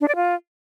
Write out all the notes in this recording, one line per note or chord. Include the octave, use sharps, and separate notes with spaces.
D4
D5
F4